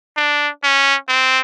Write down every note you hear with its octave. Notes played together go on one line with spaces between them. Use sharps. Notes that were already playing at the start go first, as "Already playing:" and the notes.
D4
C#4
C4